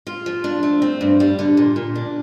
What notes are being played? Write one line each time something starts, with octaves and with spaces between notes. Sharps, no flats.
F4
F3
D4
A3
C4
G2
G3
D3
A#2
A#2
D4